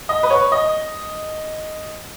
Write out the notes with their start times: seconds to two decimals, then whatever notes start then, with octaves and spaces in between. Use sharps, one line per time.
0.09 D#5
0.23 B4
0.30 C#5
0.52 D#5